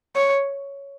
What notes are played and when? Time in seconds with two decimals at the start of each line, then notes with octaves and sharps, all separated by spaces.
0.16 C#5